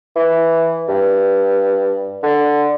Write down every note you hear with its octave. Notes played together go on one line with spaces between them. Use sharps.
E3
G2
D3